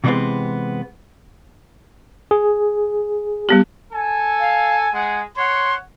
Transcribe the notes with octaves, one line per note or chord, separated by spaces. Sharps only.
C3 E3 G3 G#3 B3 C4
G#4
G3 B3 G4
A4 G#5
F5
G#3 G#4 F#5
C#5 F#5 C6